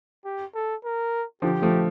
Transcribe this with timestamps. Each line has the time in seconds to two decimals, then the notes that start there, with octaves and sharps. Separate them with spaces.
0.25 G4
0.55 A4
0.84 A#4
1.42 D3 F3 G4
1.62 F3 A3